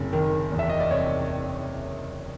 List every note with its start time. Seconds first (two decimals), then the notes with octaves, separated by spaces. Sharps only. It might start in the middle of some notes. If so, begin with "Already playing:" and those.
Already playing: F#1 C3
0.13 D#3
0.52 E2
0.59 E5
0.69 D#5
0.80 D5
0.91 C3 C#5